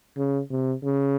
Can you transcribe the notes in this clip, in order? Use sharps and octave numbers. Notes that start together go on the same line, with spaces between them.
C#3
C3
C#3